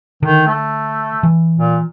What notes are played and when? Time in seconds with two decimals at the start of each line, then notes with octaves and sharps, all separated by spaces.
0.23 D3 D#3
0.47 A3
1.23 E3
1.56 A#2